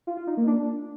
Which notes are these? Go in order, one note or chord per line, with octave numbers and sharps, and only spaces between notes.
F4
F4
D#4
A#3
D4